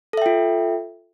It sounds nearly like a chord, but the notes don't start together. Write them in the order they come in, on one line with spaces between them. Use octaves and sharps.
A4 E5 G5 F4